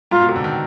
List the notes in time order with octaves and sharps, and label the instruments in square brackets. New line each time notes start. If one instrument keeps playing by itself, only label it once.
[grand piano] G#2 [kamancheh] F4
[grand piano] B2
C3
D3
D#3